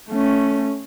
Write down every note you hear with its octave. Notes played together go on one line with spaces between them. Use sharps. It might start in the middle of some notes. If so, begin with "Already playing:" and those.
A3 C#4